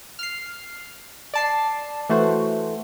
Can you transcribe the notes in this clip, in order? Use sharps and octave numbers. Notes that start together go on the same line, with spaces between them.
F6 C7
D5 A5 C7
E3 A3 F#4 C5